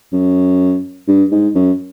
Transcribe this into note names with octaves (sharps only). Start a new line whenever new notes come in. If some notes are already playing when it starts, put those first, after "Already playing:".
F#2
G2
G#2
F#2